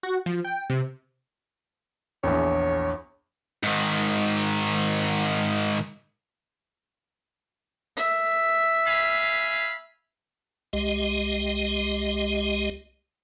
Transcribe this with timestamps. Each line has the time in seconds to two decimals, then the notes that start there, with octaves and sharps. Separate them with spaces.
0.03 F#4
0.26 F3
0.44 G5
0.70 C3
2.24 A#1 E2 C#5
3.63 G#2 D#3
7.98 E5
8.86 F5 G#5 B5
10.73 C2 G#3 G4 D#5